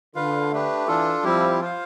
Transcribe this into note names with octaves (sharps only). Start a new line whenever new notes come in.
D3 F4 B4 F5
A3 D4 G4 B4
E3 D4 F4 A4
F3 G3 C4 E4 G4
F4 C5 F5